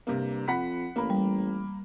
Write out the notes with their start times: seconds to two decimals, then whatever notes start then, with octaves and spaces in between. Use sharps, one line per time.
0.07 G2 C3 A#3
0.48 F2 F#5 B5 B6
0.96 A1 A#3 B5
1.10 G3